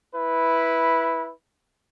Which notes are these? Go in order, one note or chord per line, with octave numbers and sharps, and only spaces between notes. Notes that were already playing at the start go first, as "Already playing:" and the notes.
E4 B4